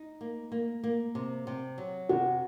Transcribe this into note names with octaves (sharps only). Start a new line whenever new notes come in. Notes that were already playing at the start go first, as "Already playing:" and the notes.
Already playing: D#4
A#3
A#3
A#3
C3
C3
F#3
C3 F#4